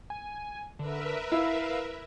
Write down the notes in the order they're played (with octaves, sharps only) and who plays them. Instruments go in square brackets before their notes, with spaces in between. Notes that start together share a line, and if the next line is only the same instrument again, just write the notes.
[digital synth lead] G#5
[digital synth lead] D3 [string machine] A#4 B4 E5
[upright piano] E4 [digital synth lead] F5